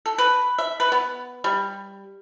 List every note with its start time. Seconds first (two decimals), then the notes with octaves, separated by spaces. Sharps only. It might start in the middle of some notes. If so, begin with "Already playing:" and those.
0.06 A4
0.18 B4
0.58 E5
0.80 B4
0.92 B3
1.44 G3